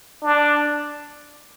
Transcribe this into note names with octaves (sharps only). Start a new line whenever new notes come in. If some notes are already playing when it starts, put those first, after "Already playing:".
D4